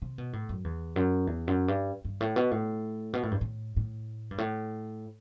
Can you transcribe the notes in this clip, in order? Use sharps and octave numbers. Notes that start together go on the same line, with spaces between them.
C3
B2
A2
F#2
E2
F#2
E2
F#2
G2
G2
A2
B2
A2
B2
A2
G2
A2
A2
G2
A2